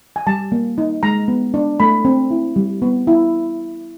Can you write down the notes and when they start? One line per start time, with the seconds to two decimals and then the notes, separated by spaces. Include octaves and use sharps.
0.16 G#5
0.27 G3 A5
0.52 A#3
0.78 D#4
1.03 G#3 A#5
1.28 B3
1.54 D4
1.80 A3 B5
2.05 C4
2.31 E4
2.56 G3
2.82 B3
3.07 E4